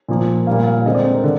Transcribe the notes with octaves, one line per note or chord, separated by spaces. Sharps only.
A#2 F3 A#3
A#2 G3 A#3 F5
F5
D3 G#3 C4 D#5
D5
C5
A#4
D3